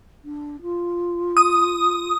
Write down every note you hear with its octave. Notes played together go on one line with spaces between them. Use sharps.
D4
F4
D#6